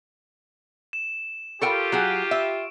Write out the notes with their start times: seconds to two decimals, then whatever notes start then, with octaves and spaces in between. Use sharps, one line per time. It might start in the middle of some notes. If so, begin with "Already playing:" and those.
0.93 E7
1.62 F4 G4 A4 A#4 G5 C#6 D7
1.92 F#3 F#4 G#4
2.31 E5